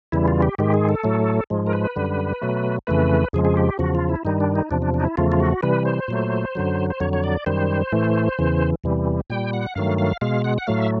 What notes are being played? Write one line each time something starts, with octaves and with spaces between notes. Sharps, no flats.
E2 C#3 E3 G3 E4
F4
G4
G#2 D#3 G#3 G4
G#4
A4
A2 F#3 A3
G#2 F3 G#3
A#4
B4
F#2 D3 G3
B2 F#3 A3
F2 C#3 E3 A3 B4
F2 C#3 F3 G#3 G#4
G#4
G4
E2 C#3 F3 F#4
F4
E4
G2 D#3 G3 D#4
D4
D#4
E2 C3 F3 D4
D4
D4
D#4
E4
E2 C#3 F3 A3 F4
F4
F#4
C3 E3 G3 B4
C5
A#2 F#3 A3
F#2 D3 F#3
C5
F2 D3 F#3 C#5
C#5
D5
F#2 D#3 G3 C5
A2 E3 A3
E2 C#3 E3
E2 C3 E3 G3
A#2 G3 G5
F#5
G2 D#3 F#3 A3 F5
F5
B2 G#3 F5
F#5
F#5
A2 F#3 A3 F5
E5